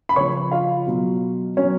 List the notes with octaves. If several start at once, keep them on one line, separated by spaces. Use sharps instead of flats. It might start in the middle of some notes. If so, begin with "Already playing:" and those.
B5
C#3 F3 C#5 C#6
F4 F5
B2 F#3
B2 F#3 C#4 C#5